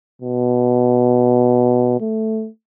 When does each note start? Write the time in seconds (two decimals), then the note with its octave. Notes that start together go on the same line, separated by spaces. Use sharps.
0.22 B2
2.00 A3